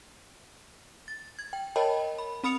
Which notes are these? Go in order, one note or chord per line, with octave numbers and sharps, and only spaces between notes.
A6
G#6
G5
A#4 C#5 D#5 G5 A5 B5
B5
C4 B5 D#6 C#7 F7